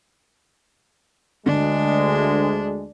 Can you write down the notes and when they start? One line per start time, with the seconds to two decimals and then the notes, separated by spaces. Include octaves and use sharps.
1.46 D2 D3 G#3 D4